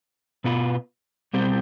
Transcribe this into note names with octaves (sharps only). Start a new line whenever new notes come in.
B2 B3 F4 B4
B2 G3 C4 G4 C5